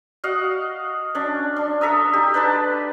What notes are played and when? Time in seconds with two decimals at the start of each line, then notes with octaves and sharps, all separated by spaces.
0.24 F#4 D#5 F5 F#5
1.15 C#4 D4
1.56 D4
1.81 A4 E5 A#5 D#6
2.13 D#4 G4
2.34 D4 B4 G5 A5